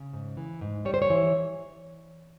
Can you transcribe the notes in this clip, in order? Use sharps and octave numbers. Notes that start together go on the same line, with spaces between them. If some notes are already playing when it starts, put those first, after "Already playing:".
Already playing: C#3
G#2
E3
G#2
G3 C#5
C5
C#5
E3